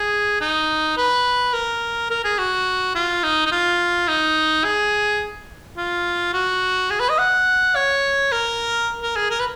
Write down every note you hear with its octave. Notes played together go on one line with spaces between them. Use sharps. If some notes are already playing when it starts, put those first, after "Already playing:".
Already playing: G#4
D#4
B4
A#4
A#4
G#4
F#4
F4
D#4
D#4
F4
D#4
G#4
F4
F#4
G#4
B4
D#5
F#5
C#5
A#4
A#4
G#4
A#4
B4